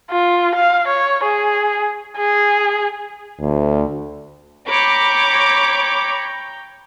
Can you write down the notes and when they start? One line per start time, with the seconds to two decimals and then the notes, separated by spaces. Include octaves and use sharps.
0.11 F4
0.56 F5
0.88 C#5
1.24 G#4
2.17 G#4
3.41 D2
4.68 C#5 G5 A#5 B5 D6